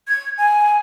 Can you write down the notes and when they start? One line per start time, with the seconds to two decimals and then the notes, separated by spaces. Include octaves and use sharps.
0.08 G#6
0.38 G#5